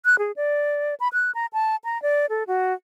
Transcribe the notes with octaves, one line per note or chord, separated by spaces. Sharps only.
F#6
G#4
D5
B5
F#6
A#5
A5
A#5
D5
A4
F#4